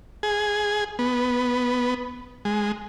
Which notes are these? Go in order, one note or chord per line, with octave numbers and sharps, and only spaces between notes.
G#4
B3
G#3